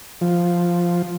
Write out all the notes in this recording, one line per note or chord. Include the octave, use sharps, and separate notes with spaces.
F3